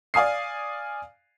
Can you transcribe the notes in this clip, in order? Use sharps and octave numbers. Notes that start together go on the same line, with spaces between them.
D5 F5 G#5 D#6 C7